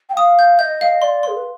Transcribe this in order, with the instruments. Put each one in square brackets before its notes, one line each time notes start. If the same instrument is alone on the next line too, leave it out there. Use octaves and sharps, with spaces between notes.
[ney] G5
[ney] F5 [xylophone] D#6
[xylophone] G6
[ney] D#5 [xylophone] G6
[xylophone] F5
[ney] D5 [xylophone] C6
[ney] G#4 [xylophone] C6
[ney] B4